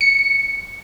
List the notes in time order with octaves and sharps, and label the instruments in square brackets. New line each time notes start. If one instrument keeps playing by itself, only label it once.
[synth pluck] C#7